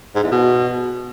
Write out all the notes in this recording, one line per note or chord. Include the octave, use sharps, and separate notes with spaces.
G#2
E2
B2